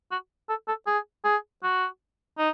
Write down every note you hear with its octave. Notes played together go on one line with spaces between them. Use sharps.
F#4
A4
A4
G#4
G#4
F#4
D#4